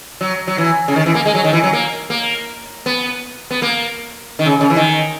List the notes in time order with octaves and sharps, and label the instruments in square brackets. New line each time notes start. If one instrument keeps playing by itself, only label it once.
[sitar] F#3
F#3
E3
C#3
D#3
E3
A#3
G#3
F#3
D#3
E3
F#3
A#3
A#3
B3
B3
A#3
D#3
C#3
C#3
E3
D#3